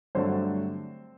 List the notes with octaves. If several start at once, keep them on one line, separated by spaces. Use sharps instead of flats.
G2 D3 F#3 A3 C4 C5